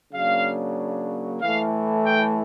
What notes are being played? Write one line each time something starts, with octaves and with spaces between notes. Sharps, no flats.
C#3 F#3 A#3 D4 F5
A2 E3 A3 F5
G5